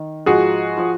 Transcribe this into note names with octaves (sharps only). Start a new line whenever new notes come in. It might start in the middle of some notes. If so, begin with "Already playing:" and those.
Already playing: D#3
G#2 F3 F#4 G#4
F3